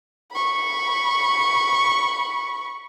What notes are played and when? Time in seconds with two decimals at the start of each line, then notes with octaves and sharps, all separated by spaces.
0.32 B5 C#6